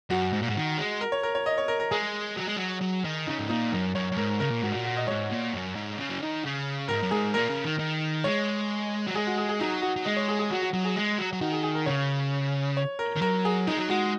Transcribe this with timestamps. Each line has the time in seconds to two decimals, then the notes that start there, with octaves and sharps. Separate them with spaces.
0.10 F#2 F#4
0.33 G#2
0.41 A#2
0.48 G#2
0.56 D#3
0.78 G#3
1.01 A#4
1.12 C#5
1.23 A#4
1.35 C#5
1.46 D#5
1.58 C#5
1.68 A#4
1.80 A#4
1.91 G#3 G#4
2.37 F#3
2.47 G#3
2.57 F#3
2.82 F#3
3.05 D#3
3.27 C#3 D#4
3.39 G#2
3.49 A#2 D#4
3.72 F#2 A#4
3.95 F#2 C#5
4.12 F#2
4.17 G#2 A#4
4.40 C#3 A#4
4.50 A#2
4.62 G#2 F#4
4.72 A#2 F#4
4.85 F#4
4.97 D#5
5.07 G#2 C#5
5.30 A#2
5.53 F#2
5.76 G#2
5.98 C#3
6.10 F#3
6.21 D#3
6.44 C#3
6.88 G#2 A#4
7.02 F#2
7.11 G#2 G#4
7.34 A#2 A#4
7.49 C#3
7.64 D#3
7.79 D#3
8.24 G#3 C#5
9.07 F#3
9.15 G#3 G#4
9.27 F#4
9.38 G#4
9.49 G#4
9.60 F#3 D#4
9.82 F#4
9.96 F#3
10.05 G#3 D#5
10.17 C#5
10.28 G#4
10.39 G#4
10.51 F#3 F#4
10.62 F#4
10.73 F#3 F#4
10.85 G#4
10.96 G#3
11.18 F#3
11.33 F#3
11.41 D#3 F#4
11.52 G#4
11.63 G#4
11.75 A#4
11.86 C#3 C#5
12.77 C#5
12.99 A#4
13.16 D#3
13.22 F#3 A#4
13.45 G#4
13.67 G#3 D#4
13.78 F#3
13.89 G#3 F#4